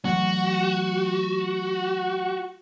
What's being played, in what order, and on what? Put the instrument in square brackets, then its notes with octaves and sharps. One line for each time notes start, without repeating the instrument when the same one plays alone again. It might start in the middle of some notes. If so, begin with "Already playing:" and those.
[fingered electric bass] E3 F#3 A3 [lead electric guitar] F#4